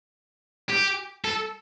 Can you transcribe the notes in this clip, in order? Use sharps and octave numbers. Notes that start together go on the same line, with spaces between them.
G4
A4